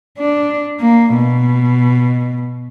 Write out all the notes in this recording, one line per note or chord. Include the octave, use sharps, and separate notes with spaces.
D4
A#3
B2